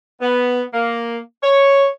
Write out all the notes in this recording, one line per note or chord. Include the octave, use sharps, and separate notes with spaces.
B3
A#3
C#5